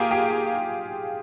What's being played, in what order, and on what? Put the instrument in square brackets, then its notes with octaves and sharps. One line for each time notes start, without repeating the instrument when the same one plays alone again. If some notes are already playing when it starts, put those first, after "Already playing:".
Already playing: [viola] A#3 [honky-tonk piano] F4 G4 G#4
[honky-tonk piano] G4